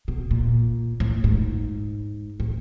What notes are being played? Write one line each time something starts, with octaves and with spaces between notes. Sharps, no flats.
B2
A#2
A2
G#2
A2